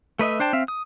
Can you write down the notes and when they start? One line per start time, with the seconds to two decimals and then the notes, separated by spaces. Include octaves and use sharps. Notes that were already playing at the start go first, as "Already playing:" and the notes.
0.19 A3 B4 D#5 E5
0.39 D4 C5 G5 A5
0.53 C4 E5 F5
0.68 D#6